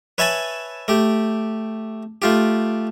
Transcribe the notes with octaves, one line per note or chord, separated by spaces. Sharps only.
B4 C#5 E5 G#5 A5 B5
A3 G4
A3 F4 G4